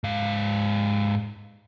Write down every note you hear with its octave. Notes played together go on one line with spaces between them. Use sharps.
G#2 F5